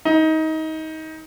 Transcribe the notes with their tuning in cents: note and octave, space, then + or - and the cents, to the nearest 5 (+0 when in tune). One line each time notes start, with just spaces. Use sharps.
D#4 +25